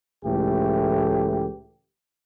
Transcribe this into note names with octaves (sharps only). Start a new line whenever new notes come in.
C#2 A2 E3 A3 G4